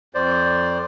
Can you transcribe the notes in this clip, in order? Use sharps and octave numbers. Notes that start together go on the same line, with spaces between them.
F2 C5 D5